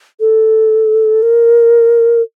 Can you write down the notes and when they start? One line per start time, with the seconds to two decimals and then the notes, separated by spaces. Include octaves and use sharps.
0.20 A4
1.22 A#4